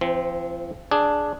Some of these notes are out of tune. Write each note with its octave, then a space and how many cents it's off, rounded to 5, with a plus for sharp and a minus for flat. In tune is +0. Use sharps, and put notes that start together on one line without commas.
F3 -40 C4 +0
D4 +0 G#4 +10